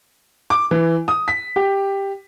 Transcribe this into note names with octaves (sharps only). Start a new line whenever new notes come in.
D6
E3
D#6
B6
G4